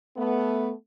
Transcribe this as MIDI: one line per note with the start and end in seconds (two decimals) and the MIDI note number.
0.16 0.72 57
0.16 0.72 59